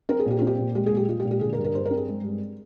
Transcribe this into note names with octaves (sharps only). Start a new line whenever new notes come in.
C4 A#4
G#4
A#2 G4
F4
C4
G4
A#2
G#3 G4
G#4
A#2
G4
G#3 F4
G4
A#2
G4
D3 G#4
A#4
G2
A#4
G2 C5
A#4
C4
G#4
G#3
G2